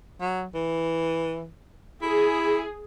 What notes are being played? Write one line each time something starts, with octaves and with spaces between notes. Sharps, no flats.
F#3
E3
E4 G#4